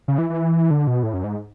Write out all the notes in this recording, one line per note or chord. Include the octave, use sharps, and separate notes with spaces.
C#3
E3
E3
D3
B2
A2
F#2
G#2